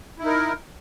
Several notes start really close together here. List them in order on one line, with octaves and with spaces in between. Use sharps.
E4 D#4 A#4